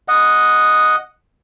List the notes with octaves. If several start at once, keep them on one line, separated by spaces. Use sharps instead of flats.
D#5 F#5